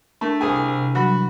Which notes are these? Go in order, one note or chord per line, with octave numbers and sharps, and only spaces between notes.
A3 D4 E4 A#4
C2 G#4 G#5
C3
E3 F#3 G3 F#4 B5